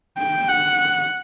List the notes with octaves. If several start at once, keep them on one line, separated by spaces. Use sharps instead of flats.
G5
F#5